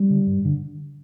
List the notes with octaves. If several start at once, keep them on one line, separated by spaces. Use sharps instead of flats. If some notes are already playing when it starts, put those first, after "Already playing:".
Already playing: G3
D3
G2
D3